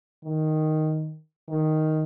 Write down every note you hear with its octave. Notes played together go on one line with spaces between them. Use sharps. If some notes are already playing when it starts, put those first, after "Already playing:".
D#3
D#3